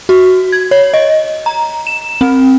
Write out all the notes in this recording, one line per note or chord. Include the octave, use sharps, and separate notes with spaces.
F#4
G#6
C#5
D#5
A#5
E7
C4